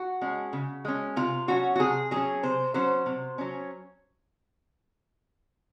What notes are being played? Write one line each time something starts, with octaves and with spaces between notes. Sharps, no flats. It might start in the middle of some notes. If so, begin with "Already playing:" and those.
Already playing: F#4
G#3 C#4
C#3
G#3 C#4
C3 F4
F#3 C#4 F#4
F#4
C3 G#4
F#3 C#4 G#4
C3 C5
F#3 C#4 C5
C3
F#3 C#4